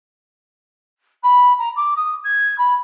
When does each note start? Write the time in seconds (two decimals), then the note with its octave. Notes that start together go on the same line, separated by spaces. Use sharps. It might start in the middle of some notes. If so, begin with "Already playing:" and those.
1.23 B5
1.58 A#5
1.76 D6
1.96 D#6
2.24 G#6
2.58 B5